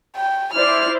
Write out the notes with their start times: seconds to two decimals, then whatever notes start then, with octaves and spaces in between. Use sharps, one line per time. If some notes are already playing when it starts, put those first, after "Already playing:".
0.16 G5
0.54 E4 C5 D5 F6